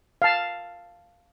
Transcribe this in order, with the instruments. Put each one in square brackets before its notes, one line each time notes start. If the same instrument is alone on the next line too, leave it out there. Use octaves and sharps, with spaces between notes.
[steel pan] F5 A5